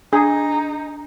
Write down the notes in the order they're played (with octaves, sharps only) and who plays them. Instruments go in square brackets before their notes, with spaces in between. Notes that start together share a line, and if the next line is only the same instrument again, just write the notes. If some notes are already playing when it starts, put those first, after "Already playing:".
[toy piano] D4 [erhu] D#4 [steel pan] G#4